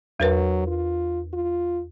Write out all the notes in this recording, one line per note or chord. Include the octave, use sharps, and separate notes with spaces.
E2 F#3 A#4 B4
F4
F4